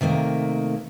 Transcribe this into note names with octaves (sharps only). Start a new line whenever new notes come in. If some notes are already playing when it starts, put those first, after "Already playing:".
C3 D#3 A3 A#3